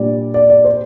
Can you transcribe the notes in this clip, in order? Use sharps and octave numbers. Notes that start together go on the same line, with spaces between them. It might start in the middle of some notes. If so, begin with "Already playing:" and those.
Already playing: A#2 G3 D4 D5
D5
D5
C5